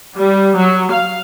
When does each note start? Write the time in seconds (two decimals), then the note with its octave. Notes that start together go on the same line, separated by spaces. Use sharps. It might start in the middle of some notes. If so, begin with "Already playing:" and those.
0.16 G3
0.56 F#3
0.91 F5